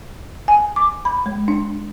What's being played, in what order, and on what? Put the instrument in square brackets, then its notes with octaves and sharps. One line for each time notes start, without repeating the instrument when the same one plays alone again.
[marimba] G#5
D6
B5
G#3
D4